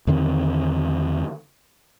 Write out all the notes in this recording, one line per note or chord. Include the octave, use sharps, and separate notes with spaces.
E2 D3 D#3 C4